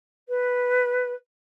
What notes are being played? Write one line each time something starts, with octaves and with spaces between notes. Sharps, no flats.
B4